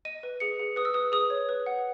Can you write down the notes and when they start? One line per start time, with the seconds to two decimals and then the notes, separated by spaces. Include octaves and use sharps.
0.05 D#5 D#7
0.23 B4
0.40 G#4 C#7
0.59 G#4
0.76 B4 D#6
0.85 E6
0.94 B4 D#6
1.12 G#4 D#6
1.30 C#5
1.49 B4
1.66 F#5